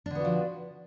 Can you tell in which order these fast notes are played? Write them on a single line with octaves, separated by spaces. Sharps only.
D4 D3 B3 F#4 F3